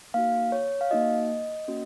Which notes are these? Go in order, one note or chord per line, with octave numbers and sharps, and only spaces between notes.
A#3 D#4 F#4 F5
C#5
F5
A#3 D#4 F#4 D#5
A#3 C#4 F#4